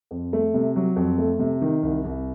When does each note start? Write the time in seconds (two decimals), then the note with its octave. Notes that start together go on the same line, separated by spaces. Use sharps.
0.11 F2
0.33 A3
0.54 C3
0.76 F#3
0.96 F2
1.18 A3
1.39 C3
1.62 D#3
1.83 C2
2.04 C2